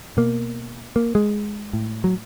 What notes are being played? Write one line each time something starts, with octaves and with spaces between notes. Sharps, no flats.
B2 A#3
A#3
G#3
A2
F#3